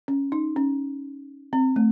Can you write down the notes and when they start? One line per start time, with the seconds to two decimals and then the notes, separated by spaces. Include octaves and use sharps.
0.08 C#4
0.32 D#4
0.56 C#4
1.53 C4
1.76 A3